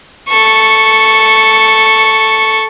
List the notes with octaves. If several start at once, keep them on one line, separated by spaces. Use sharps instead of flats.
A4 C#6